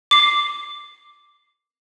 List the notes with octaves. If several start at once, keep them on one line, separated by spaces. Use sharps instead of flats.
D6 C7